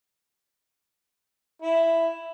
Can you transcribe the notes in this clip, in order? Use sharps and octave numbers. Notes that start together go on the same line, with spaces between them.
E4